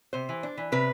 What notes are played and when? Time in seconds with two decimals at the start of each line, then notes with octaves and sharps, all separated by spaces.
0.13 C3 C5
0.29 E3
0.43 D4
0.57 E3
0.72 C3 B4